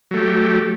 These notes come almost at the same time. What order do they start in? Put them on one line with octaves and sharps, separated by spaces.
F#3 A3 G4